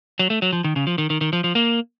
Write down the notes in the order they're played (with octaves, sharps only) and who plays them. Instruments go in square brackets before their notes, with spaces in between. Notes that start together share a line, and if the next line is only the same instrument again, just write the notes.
[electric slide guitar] F#3
A3
F#3
F3
D#3
C#3
F3
D#3
D#3
D#3
F3
F3
A#3